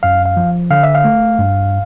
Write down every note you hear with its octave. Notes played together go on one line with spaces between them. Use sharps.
F#2 F5
F5
F3
D3 F5
E5
F5
A3
G2